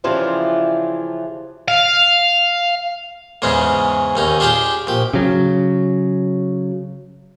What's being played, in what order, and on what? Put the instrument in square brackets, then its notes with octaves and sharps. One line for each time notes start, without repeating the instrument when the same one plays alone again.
[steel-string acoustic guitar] C#3 E3 F3 D4 F4 G4
[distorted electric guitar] F5
[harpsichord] E2 G#2 C#3 G#3 C#4
D#2 C#4 D#4
D4 F4 G4 G#4 G5
A#1 G4
[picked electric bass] C#3 F#3